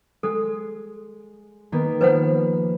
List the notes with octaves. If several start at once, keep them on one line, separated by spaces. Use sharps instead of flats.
G#3 A4
D#3 A#3 B3
F3 B4 C5 F#5